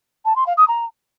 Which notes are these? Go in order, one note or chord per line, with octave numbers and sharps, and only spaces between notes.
A5
C6
F5
D#6
A#5